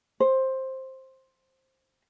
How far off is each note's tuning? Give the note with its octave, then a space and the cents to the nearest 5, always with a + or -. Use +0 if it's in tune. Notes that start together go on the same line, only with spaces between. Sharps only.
C5 +10